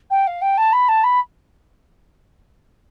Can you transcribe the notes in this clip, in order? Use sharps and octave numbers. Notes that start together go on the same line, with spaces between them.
G5
F5
G5
A5
B5
A5
B5